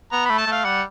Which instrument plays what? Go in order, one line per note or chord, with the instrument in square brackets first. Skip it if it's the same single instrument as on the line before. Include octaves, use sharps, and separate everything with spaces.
[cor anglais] B3 [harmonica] A#5
[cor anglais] A3 [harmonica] B5
[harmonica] A5
[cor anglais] A3 [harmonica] F5
[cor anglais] G3 [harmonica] F#5